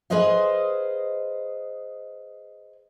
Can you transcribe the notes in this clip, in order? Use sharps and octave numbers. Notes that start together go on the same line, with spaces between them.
G#4 B4 C5 D#5 F5